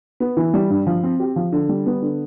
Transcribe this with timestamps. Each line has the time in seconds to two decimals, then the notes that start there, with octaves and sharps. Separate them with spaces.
0.20 B3
0.37 E3
0.54 G3
0.70 G2
0.87 F3
1.03 C4
1.20 G4
1.36 F3
1.52 D3
1.69 G3
1.86 B3
2.02 D3